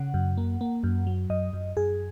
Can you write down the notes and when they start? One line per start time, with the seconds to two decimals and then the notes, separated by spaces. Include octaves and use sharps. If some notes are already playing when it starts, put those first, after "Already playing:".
Already playing: C#3 F#5
0.14 F#2
0.37 A#3
0.61 A#3
0.84 F#2
1.07 F#3
1.30 F#2 D#5
1.53 F#2
1.77 F#2 G#4